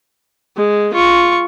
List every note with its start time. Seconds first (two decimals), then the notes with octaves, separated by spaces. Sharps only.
0.57 G#3
0.94 F4 C#6